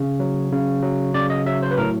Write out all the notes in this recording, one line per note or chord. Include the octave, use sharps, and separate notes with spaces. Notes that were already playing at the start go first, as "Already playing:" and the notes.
Already playing: C#3
F#3
C#3
F#3
C#3 D5
D#5
F#3 E5
C5
B4
A2 A#4